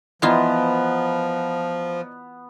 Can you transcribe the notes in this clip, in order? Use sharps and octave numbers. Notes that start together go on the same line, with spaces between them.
E3 F3 B3 F4 D5 D#5 A#5